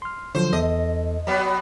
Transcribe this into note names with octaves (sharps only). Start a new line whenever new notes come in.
C6 F6
D3 F3 F#3 C5
E2 A4 D#5
F#3 B3